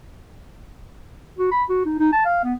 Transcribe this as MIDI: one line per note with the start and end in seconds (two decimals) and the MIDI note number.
1.39 1.50 66
1.51 1.63 83
1.69 1.82 66
1.86 1.97 63
1.99 2.10 63
2.12 2.23 81
2.25 2.42 77
2.44 2.54 59